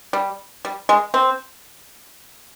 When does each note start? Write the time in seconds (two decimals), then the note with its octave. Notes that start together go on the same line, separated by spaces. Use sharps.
0.13 G3
0.65 G3
0.89 G#3
1.14 C4